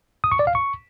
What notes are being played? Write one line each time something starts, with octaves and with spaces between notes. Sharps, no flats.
D#6
C#6
D5
F5
C#6